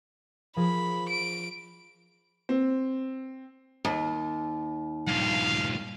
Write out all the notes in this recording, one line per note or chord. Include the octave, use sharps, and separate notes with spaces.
F3 G#4 A#4 B5
D7
C4
D#2
G2 A#2 F5